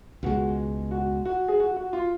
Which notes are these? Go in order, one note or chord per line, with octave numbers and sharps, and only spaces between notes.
C#2 B2 G#3 F#4
F#4
F#4
G#4
F#4
F#4
F4